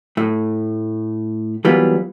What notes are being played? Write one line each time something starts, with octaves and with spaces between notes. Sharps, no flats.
A2 A3
E3 F#3 G3 A#3 B3 F4